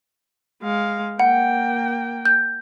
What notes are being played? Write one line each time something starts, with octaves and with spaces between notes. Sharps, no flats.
G#3 F5
A#3 F#5 G5
G6